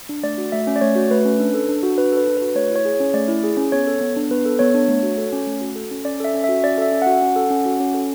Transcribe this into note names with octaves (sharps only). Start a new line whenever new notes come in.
D4
A3 D5
F#4
A3 E5
C#4
D5
A3 C#5
F#4
A3 B4
C#4
D4
A4
D4
F#4
D4 B4
A4
B4
D4
F#4 B4
A3 C#5
E4
C#5
G#4
C#5
C#4
A3 D5
E4
G#4
C#4
B3 C#5
A4
B3
D4
B3 B4
A4
B3 C#5
D4
A3
F#4
A4
C#4
A3
F#4
A4
C#4
C#4 D5
A4 E5
C#4
E5
F#4
C#4 D5
A4 E5
C#4
F#4 F#5
C#4
A4
C#4
F#4
C#4
A4